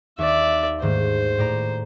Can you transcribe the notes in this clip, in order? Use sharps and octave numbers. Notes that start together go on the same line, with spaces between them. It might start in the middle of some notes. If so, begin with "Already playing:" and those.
D#2 D5 E5
G#2 D#3 A3 C5
A2 D5 A#5